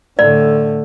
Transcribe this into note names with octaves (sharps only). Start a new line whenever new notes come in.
A2 D3 D5